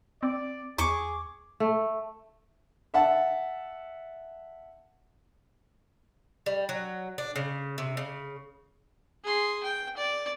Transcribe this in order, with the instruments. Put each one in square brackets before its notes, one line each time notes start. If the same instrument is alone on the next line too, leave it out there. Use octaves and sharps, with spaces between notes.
[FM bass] C4 [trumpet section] D5
[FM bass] E2 [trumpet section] G#4 [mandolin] C#6 D6
[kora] A3
[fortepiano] E5 F#5 A5
[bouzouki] G3
F#3
D4
C#3
C3
C#3
[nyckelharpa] G#4 C6
G5
D5